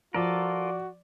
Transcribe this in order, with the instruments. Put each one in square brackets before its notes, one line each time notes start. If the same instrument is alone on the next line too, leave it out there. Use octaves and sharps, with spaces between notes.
[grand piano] F3 [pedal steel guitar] F4 A4 A#4 [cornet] F#4 [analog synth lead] D5